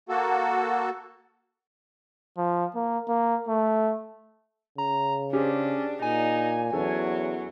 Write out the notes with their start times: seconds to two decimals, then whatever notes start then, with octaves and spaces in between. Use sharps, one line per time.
0.09 A#3 F#4 A4
2.38 F3
2.75 A#3
3.09 A#3
3.49 A3
4.78 C#3 A#5
5.33 C#4 D4 G4 G#4 C5
6.02 A#2 D#4 G#5
6.73 E2 E3 F#3 C#4 A4